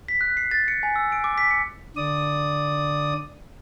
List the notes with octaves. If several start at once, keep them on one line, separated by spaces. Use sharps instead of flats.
B6
F#6
C7
A6
C#7
G#5
E6
D7
D6
B6
C#7
D3 D5 D#6